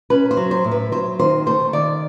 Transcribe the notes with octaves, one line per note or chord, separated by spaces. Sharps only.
C#4 B4
C5
F#3
C5
A2
B4
F#3 C5
D#3 C5
A3 C5
D#3 D5